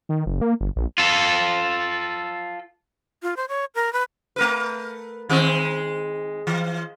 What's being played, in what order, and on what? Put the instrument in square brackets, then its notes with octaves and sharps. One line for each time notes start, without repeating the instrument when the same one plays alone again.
[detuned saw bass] D#3
F#1
A#3
G1
A#1
[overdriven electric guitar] F4 A4
[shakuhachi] F4
C5
C#5
A#4
B4
[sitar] A3 A#4 B4
D#3 G#3 C4
E3